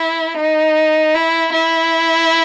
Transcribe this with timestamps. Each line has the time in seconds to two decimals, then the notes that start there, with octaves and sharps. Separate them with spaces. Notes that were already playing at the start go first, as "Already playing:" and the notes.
Already playing: E4
0.37 D#4
1.14 E4
1.53 E4